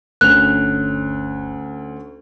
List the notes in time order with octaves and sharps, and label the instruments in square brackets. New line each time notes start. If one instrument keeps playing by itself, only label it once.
[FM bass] G1 [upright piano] D2 C#4 F7 [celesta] F#6